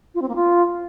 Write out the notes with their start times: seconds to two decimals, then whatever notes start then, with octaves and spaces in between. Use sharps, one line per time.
0.15 F4
0.22 C4
0.29 A#3
0.35 F4